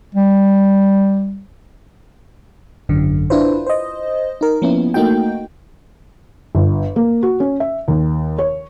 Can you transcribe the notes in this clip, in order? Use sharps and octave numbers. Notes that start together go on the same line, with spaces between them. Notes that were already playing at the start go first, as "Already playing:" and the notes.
G3
G#1 F#2 D3
D4 E4 F4 B4 C5
C5 D#5
D#4 A#4
F3 A#3 B3 C#4 E4
A3 A#3 D#4 F#4 G5
G1
A#3
F#4
C#4
E5
D#2
C#5